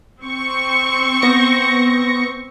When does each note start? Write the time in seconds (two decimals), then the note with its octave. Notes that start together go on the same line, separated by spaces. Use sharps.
0.22 C4 C#6
1.22 B3 A#6 C#7